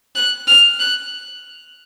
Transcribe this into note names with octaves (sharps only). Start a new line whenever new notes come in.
F#6
F6
F#6